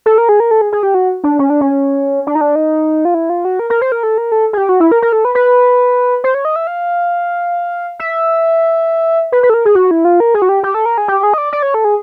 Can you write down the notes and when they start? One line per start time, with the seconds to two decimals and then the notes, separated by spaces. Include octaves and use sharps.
0.06 A4
0.18 A#4
0.29 G#4
0.40 A#4
0.51 A4
0.61 G#4
0.72 G#4
0.83 G4
0.94 F#4
1.24 D4
1.39 C#4
1.50 D4
1.61 C#4
2.27 D4
2.35 D#4
2.41 D4
2.55 D#4
3.05 F4
3.14 E4
3.30 F4
3.45 F#4
3.59 A#4
3.70 A#4
3.82 C5
3.92 A#4
4.03 A4
4.18 A#4
4.32 A4
4.53 G#4
4.57 G4
4.69 F#4
4.80 E4
4.92 A#4
5.02 A#4
5.13 A4
5.25 B4
5.35 B4
6.24 C5
6.34 C#5
6.45 D#5
6.56 E5
6.67 F5
7.99 E5
9.32 B4
9.43 B4
9.50 A4
9.54 A#4
9.65 G#4
9.75 F#4
9.91 E4
10.05 F4
10.20 A#4
10.34 G#4
10.42 F#4
10.49 G4
10.63 G4
10.74 A4
10.86 A#4
10.98 G#4
11.08 G4
11.23 G#4
11.34 D#5
11.38 D5
11.53 D5
11.63 C#5
11.74 A4
11.85 G#4